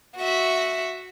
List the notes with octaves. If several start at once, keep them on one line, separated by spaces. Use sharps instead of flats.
F#4 E5